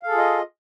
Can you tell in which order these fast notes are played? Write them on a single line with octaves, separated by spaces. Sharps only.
F5 A4 G#4 F4 D#5